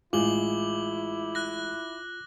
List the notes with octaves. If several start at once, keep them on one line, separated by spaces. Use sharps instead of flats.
A1 G#3 E4 F4 D6 F#7 G7
F#6 A#6